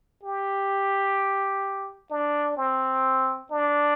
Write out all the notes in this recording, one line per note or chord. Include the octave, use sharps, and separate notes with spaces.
G4
D4
C4
D4